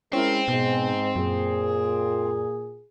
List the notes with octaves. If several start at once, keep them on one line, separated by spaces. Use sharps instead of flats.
G#3 C4 C#4 E4 A#4
G#2 B2 B3
F#2 A#2 G#4